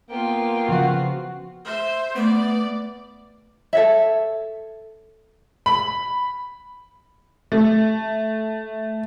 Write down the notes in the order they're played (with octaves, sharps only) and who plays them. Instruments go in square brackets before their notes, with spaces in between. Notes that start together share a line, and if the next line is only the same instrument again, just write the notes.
[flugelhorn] A#3 [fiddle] B3 F4 [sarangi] G5
[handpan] C#3 F3 F#5 [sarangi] F#4
[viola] C5 E5
[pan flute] A3 [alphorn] B3 [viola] D5
[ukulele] A4 C#5 E5
[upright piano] B5
[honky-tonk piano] A3